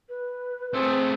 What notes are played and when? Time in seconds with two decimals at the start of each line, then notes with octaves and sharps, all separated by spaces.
0.09 B4
0.74 A3 C4 G#4